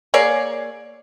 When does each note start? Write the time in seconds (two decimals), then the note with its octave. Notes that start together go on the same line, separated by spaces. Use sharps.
0.14 A#3 G#4 C#5 D5